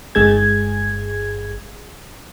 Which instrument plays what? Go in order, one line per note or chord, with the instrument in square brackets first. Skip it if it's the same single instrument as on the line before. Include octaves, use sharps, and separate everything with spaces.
[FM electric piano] G1 G#3 G#4 G#6